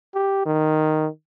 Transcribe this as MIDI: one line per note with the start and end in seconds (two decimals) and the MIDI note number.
0.14 0.42 67
0.46 1.08 51